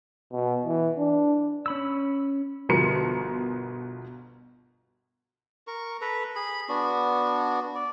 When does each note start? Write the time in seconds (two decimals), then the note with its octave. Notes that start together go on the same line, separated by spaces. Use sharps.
0.32 B2
0.65 E3
0.98 D4
1.66 C#4 B5 E6
2.69 G1 B2 F3 A#4 C6 C#7
5.67 A#4 C#6
6.01 A4 B4 A#5
6.35 G#4 B5
6.69 B3 D4 F#4
7.75 D5